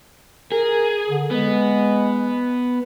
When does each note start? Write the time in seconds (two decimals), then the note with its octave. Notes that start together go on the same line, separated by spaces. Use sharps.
0.52 G#4 A#4
1.10 D3
1.31 G#3 B3